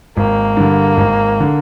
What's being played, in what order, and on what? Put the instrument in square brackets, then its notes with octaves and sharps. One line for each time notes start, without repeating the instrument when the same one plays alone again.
[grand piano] G#1 [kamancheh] A#3
[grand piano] G2 D3
G#1
D3